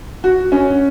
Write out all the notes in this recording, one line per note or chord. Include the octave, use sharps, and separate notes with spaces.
F#4
C#4